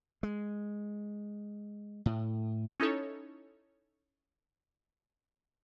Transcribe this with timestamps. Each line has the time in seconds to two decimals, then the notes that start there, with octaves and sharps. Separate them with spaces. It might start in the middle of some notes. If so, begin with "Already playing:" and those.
0.23 G#3
2.06 A2
2.80 C#4 D#4 E4 A4 C#5